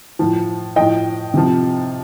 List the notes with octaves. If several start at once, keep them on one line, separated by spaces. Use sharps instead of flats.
A2 F3
A2 F3 D#5 G5
C3 F3